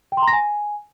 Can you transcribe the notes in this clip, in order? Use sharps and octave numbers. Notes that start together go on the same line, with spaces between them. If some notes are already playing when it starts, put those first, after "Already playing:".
G5
C6
A#5
A#6
G#5